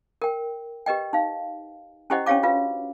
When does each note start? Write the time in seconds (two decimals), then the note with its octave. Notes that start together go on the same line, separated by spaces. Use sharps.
0.22 A#4 G5
0.86 G4 B4 D#5 G5
1.13 D#4 F5
2.10 C#4 E4 G4 C5 D#5 F#5
2.26 C#4 D4 G4 C#5 F5 D6
2.43 F4 F#4 B4 F5